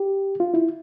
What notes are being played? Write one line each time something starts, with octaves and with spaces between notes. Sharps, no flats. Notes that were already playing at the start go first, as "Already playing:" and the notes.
Already playing: G4
F4
E4